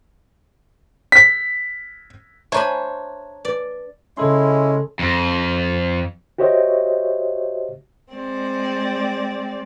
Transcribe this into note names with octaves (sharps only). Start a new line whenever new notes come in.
B6
D4 C5 C#5 E5 G#5 A#5 B5 D6
B4 D5
C#3 G#3 C#4 E4 A4 C6
F2
F#4 G4 C5 C#5 D#5 E5
G#3 C4 D5